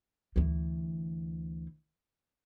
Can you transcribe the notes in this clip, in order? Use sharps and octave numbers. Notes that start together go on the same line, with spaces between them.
D2 E3